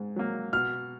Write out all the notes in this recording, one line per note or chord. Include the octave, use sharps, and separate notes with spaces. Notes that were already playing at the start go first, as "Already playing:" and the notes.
Already playing: G#2
F#3 A#3
B2 F6